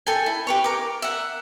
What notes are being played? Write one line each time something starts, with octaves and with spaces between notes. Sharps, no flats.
A4 G5 G#5
E4
G4 B4 C#5
A#4 D6
E5 F#5